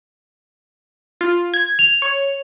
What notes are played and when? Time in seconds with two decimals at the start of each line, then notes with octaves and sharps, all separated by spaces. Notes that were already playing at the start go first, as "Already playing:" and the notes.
1.21 F4
1.54 G#6
1.79 F7
2.02 C#5